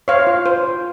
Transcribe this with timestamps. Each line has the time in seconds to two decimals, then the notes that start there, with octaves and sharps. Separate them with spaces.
0.08 C5 C#5 F5
0.27 F4
0.46 C5
0.63 F4